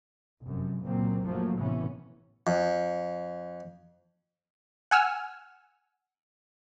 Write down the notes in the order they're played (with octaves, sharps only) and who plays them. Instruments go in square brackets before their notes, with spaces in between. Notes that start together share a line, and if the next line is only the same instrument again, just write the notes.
[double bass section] F1 F#2
C#2 A#2 F#3 A#3 C4
F#1 F#2 F3 F#3 A3 A#3
A1 C3 E3 B3 C#4
[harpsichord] F2
[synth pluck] F#5 G#5 E6 F6